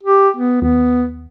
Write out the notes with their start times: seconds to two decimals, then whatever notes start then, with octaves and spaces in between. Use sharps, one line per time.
0.03 G4
0.36 B3
0.62 D#2 B3